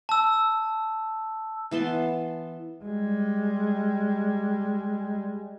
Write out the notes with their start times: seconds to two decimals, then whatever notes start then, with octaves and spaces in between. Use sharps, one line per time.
0.09 A5 E6
1.71 E3 B3 A5 C6
2.84 G3 G#3